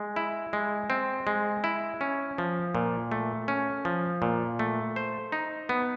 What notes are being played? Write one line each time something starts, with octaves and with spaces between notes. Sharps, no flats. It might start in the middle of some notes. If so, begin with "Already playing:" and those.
Already playing: G#3
E4
G#3
C4
G#3
E4
C#4
F3
A#2
A3
C#4
F3
A#2
A3
C5
D#4
B3